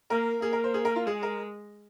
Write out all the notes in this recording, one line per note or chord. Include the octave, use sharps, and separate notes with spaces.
A#3 A#4
A#3 G#4
A#4
C5
G#4
A#4
F4
G#3 G#4
A#4